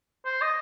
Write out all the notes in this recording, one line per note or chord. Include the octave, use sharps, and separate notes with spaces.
C5
D#5